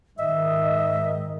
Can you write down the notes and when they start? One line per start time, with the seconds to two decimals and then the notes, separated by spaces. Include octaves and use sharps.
0.19 G#2 D#3 D#5 E5